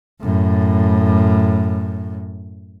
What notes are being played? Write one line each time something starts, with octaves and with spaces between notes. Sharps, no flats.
F#2 A2